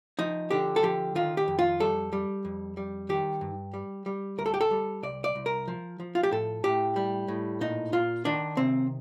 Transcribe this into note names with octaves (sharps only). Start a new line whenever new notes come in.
F3 D#4
D3 G4
A4
F3 G4
D#3 F4
G4
F2
F4
G3 A4
G3
F2
G3
D#3 G4
G2
G3
G3
D2 A#4
A4
G4
A4
G3
C2 D5
D5
C2
A#4
F3
F3
F4
G4
A2 A4
A2 G4
G3
A2
A#2 D#4
A#2 F4
D#3 D4
C3 C4